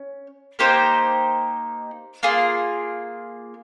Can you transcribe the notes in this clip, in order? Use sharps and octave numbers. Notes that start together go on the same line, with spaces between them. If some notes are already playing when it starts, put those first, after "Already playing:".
Already playing: C#4
A#3 D#4 G4 C5
A#3 F4 G#4